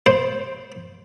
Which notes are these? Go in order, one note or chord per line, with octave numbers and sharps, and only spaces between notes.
C5